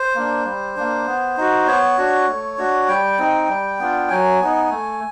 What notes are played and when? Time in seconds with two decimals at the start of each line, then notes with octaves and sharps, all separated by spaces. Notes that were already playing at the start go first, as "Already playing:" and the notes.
Already playing: C5
0.15 A#3 D4
0.45 G3
0.77 A#3 D4
1.06 B3
1.37 D#4 F#4
1.67 B3 C#5
1.98 D4 F#4
2.28 A3
2.58 D4 F#4
2.88 G3 G5
3.18 C4 D#4
3.49 G3
3.79 B3 D4 F4
4.10 F#3 G#5
4.40 B3 D#4
4.70 A3